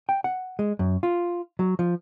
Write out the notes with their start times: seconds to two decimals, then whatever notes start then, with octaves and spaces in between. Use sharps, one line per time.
0.09 G5
0.24 F#5
0.59 G#3
0.79 F#2
1.03 F4
1.59 F#3
1.79 F3